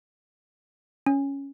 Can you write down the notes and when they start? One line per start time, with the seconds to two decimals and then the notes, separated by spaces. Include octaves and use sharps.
1.06 C#4